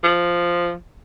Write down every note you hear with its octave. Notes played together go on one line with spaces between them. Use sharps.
F3